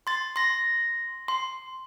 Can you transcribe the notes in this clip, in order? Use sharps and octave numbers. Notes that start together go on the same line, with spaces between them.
C6 A6
C6 A#6
C6